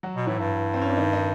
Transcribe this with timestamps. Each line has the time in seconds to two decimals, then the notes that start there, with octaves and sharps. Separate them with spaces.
0.03 F#3 F#4
0.15 B2
0.27 A2 E3 E4
0.39 G2
0.74 C4
0.82 C#4
0.89 D4
0.97 D#3 D#4
1.13 D#3 D#4